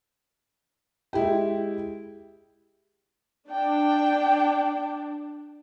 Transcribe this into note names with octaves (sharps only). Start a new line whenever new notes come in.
G#3 E4 G4 G5
D4 G5